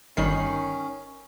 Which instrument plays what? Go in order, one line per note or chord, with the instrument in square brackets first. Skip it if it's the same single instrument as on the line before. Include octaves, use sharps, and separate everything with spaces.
[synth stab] G1 G3 C7 [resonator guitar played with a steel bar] D#3 [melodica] C#4